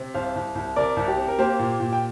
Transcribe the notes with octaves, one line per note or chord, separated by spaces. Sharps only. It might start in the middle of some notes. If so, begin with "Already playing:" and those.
Already playing: C3
C2 C5 F5
C2
C2
C3 A#4 D5
C2
G4
C4
A#4
A#3 G4 C5
A#2
A#2
G5